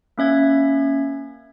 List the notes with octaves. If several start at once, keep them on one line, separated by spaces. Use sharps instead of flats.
A#3 C#4 E5 G#6